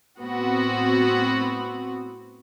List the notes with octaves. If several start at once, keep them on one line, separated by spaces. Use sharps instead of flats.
A2 B3 C4 F#4